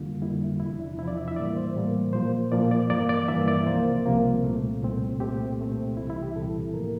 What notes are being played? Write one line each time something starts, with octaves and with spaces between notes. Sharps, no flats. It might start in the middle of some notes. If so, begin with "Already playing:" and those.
Already playing: F2 D3 G3 A#3 F4
F2 D3 G3 A#3 E4
E2 C3 F3 E4
D4
E2 C3 F3 E4
D5
E5
E5
A2 E3 G3 A#3 D5
C5
A2 E3 G3 A#3
A#2 F3 A#3 C5
A#2 F3 A#3 D5
D5
G2 E3 A#3 D5
D5
G2 E3 A#3 E5
D5
C2 C3 F3 A#3 C5
C2 C3 F3 A#3
C2 A#2 A3 C4
C2 A#2 A3 C4
C2 A#2 A3 C4 G4
C2 A#2 A3 C4
C2 C3 E3 E4
E4
G4
C2 C3 E3 A4
A2 F3 A#3 A#4